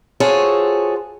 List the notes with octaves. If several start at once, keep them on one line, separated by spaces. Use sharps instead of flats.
F4 F#4 G#4 A4 C5 C#5